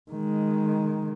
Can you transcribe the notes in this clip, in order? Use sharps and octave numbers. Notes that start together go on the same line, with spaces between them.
D#3 G#3